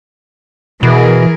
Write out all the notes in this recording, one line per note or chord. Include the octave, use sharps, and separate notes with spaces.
B2 E3 G#4 A#4